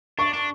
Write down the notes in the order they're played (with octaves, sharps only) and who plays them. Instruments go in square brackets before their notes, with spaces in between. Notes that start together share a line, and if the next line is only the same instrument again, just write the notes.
[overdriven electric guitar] D4 [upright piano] C#6
[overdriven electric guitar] D4